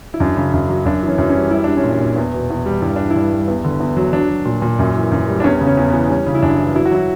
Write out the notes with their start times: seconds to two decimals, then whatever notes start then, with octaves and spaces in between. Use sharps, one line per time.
0.14 E4
0.20 F#2 D4
0.37 C#3
0.53 F#2
0.69 F#3
0.85 F#2 D4
1.03 E3
1.08 C#4
1.18 F#2
1.30 C#4
1.36 G3
1.51 G3 E4
1.64 G3 D4
1.77 C#4
1.84 A#2
1.91 D4
2.00 A#2
2.16 E2
2.33 B2
2.50 E2
2.66 G3
2.82 G2 E4
2.96 E3 D4
3.11 E4
3.16 G2
3.32 G3
3.48 E2
3.64 D3
3.80 E2
3.97 F#3
4.13 F#3 D4
4.29 F#3
4.45 A#2
4.62 A#2
4.79 F#2
4.96 E3
5.12 F#2
5.28 G3
5.40 D4
5.44 E2 C#4
5.61 C#3
5.66 C#4
5.77 E2
5.88 B3
5.93 E3
6.09 G3 C#4
6.26 C#3
6.35 E4
6.42 F#2 D4
6.58 E3
6.75 F#3 E4
6.86 F#4
6.91 F#3 E4